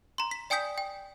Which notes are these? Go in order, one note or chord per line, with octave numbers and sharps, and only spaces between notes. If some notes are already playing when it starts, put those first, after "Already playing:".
A#5 C6
B6
D5 G5 G#5 D#6 G6 B6
G5